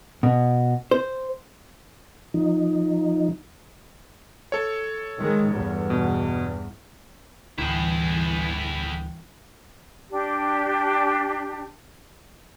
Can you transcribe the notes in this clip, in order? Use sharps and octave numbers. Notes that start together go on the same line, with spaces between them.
B2
C5
F3 D#4
A4 C#5
D#3 G#3
E2 G2
B2
G1 D2 A2 E3 E4 G#4
D4 G4